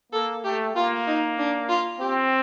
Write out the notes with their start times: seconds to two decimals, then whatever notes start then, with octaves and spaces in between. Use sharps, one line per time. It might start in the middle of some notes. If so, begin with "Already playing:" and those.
0.12 A#3 A4
0.43 A3 G4
0.75 A#3 F4
1.07 D#4
1.38 D4
1.69 F4
2.00 C4 G4